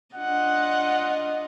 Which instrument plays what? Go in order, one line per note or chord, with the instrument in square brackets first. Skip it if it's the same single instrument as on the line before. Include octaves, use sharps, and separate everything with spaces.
[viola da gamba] D4 F4 D#5 [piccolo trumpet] F#5